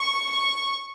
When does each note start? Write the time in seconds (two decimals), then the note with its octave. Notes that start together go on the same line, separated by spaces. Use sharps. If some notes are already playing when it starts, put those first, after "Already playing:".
Already playing: C#6
0.29 C#6